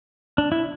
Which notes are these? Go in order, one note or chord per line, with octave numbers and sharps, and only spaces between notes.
D4
E4